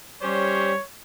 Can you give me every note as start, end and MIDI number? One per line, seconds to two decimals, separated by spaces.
0.22 0.76 55
0.22 0.72 61
0.22 0.72 67
0.22 0.72 72
0.22 0.84 73